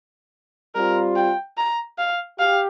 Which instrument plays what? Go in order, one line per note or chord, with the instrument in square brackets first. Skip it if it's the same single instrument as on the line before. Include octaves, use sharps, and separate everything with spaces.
[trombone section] G3 C4 F4 [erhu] A#4
[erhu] G5
A#5
F5
[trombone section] G4 [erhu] F5